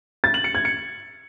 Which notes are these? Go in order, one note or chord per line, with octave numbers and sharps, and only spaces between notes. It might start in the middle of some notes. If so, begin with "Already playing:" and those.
A6
F#7
C#7
G#6
C#7